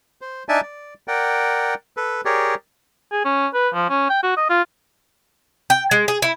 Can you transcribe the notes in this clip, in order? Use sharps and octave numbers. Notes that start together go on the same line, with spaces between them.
C5
D4 D#4 D5 E5 G#5 A5
D5
A#4 D5 F#5 G5
A4 B4
G4 G#4 A#4 C#5 D5
G#4
C#4
B4
F3
C#4
G5
F#4
D#5
F4
G5
G#3
G#4
E4